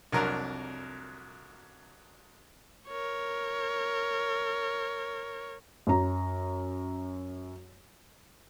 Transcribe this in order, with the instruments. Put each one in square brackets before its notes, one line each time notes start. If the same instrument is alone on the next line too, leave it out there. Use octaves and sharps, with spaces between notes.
[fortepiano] C2 F2 F#3 D4 A#4
[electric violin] A#4 C#5
[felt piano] F#2 A#5